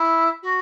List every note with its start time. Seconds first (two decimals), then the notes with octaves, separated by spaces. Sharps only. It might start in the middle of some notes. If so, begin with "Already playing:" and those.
Already playing: E4
0.42 F#4